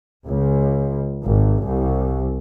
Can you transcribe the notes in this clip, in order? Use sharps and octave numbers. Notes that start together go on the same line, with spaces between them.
C#2
G#1
C2